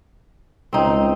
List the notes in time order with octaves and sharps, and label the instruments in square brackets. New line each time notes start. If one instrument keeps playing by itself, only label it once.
[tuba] C#2 [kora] C4 D#4